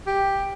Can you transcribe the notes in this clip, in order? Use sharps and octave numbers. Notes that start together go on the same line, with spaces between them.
G4